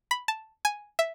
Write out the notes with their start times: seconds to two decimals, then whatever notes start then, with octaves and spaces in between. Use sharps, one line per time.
0.11 B5
0.28 A5
0.65 G#5
0.99 E5